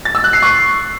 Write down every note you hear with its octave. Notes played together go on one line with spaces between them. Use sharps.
A6
E6
F#6
C7
C#6